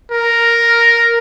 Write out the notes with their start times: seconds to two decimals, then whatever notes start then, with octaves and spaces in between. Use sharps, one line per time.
0.11 A#4